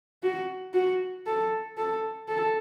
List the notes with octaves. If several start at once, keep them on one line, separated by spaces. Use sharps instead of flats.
F#4
F#4
A4
A4
A4